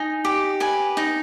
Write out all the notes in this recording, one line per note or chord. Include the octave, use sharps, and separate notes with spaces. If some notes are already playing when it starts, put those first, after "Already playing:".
Already playing: D#4 G#5
G4
B4 G#5
D#4